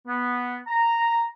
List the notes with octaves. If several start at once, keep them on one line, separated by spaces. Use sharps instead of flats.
B3
A#5